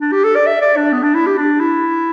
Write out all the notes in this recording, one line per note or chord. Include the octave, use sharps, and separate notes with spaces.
D4
G4
A4
D5
E5
D5
D4
B3
D4
E4
G4
D4
E4